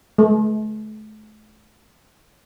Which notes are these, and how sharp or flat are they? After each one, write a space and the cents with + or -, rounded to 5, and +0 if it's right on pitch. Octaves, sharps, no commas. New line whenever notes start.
A3 -40